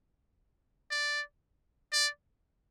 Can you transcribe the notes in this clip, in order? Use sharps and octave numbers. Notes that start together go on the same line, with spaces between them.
D5
D5